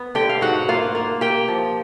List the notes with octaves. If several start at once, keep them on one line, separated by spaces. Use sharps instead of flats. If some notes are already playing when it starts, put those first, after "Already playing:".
Already playing: B3
D3 G4 G5
F5
G#2 F#4 F#5
A#3 F4 F5
A#3
A#3 G4 G5
F3